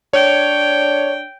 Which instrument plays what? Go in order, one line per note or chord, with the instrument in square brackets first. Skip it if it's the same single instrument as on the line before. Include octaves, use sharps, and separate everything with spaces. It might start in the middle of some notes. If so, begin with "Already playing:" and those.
[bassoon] D4 [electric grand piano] C#5 [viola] G5